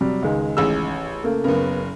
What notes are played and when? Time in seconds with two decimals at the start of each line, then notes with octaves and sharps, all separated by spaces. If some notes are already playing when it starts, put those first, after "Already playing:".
0.01 C3 F#3 G3
0.22 C#2 D#3 G#3
0.57 A1 G#4 E6
1.24 C#3 A3 A#3
1.44 F#1 C#3 B3 A#4